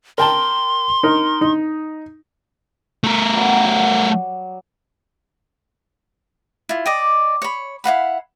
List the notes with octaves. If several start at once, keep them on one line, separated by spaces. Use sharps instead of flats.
A#4 G5 A5 C6
D#4 A#4
D#4
A3 A#4
F#3 G3 G4
F#3 D6
E4 F4
D5 D#5 G5
C#5 B5
E4 F5 F#5 B5